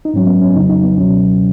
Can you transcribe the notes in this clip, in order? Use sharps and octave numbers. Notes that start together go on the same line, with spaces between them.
D#4
G#2 F#3 C#4
B3
C#4
F2 C#3 F#3 D#4
D#4
B3
C#2 B2 F#3 C#4